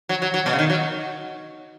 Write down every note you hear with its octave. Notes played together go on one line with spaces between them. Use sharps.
F#3
F#3
F#3
B2
C#3
D#3
F#3